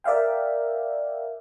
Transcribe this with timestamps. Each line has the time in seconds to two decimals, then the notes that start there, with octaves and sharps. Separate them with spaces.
0.04 A#4 D5 E5 F5 G5